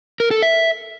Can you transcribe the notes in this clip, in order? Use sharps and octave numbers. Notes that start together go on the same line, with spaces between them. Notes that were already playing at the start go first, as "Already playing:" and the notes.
A#4
A4
E5